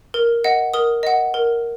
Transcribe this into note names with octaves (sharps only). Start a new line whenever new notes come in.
A#4
D#5 F#5
A#4 D#6
D#5 F#5
A#4